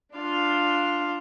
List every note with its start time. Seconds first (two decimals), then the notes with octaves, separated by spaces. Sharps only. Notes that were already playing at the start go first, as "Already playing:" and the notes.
0.15 D4 F4 F5